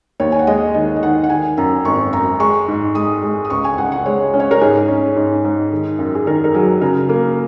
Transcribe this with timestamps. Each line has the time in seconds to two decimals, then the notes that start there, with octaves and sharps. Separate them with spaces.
0.20 D#2 C#5
0.32 G#5
0.39 F#5
0.47 G#3 D#5
0.74 D#3 D#5
0.96 D#5
1.03 D#3 F#5
1.24 F#5
1.30 D#3 G#5
1.57 F#2 A#5
1.85 G#1 C#6
2.13 F#2 A#5
2.40 G#3 C#6
2.68 G#2
2.95 G#3 D#6
3.23 G#3
3.45 D#6
3.50 C#2 C#6
3.64 G#5
3.78 C#2 F#5
3.92 F#5
4.06 G#3 C#5
4.34 C#4
4.40 C#5
4.51 A#4
4.61 G#2 G#4
4.88 C#4
5.16 G#2
5.44 G#2
5.72 D#3
5.99 F#2
6.15 G#4
6.26 D#3 A#4
6.44 A#4
6.54 F#3 G#4
6.81 C#3 A#4
7.09 A#3